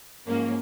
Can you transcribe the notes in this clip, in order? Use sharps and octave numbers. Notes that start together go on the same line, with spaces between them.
G#2 F3 A#3 C#4